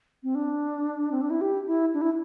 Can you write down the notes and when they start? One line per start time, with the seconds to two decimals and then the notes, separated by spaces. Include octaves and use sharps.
0.23 C4
0.35 D4
1.11 C4
1.21 D4
1.30 E4
1.41 G4
1.67 E4
1.94 D4
2.01 E4